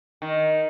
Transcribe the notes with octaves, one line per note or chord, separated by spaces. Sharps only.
D#3